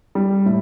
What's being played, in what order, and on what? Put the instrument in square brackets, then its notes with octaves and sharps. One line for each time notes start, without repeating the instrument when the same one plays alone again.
[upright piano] G3
A2